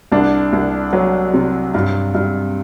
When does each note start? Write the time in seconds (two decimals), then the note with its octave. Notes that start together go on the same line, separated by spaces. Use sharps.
0.12 C2 D4
0.53 C2
0.93 F#3
1.34 C3
1.74 G2
2.15 G2